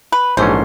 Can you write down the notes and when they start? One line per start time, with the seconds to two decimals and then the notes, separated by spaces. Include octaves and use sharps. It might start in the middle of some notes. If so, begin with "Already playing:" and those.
0.12 B4
0.37 A#1 G#2 E3 A3 C#4 C5